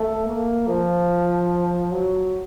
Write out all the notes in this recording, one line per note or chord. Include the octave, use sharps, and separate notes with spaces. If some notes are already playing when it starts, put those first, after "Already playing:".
Already playing: A3
A#3
F3
F#3